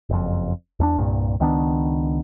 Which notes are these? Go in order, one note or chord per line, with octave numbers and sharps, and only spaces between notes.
F#1 F2
E2 A3 D4
C2 G2 A#2
C#2 D#3 B3 D4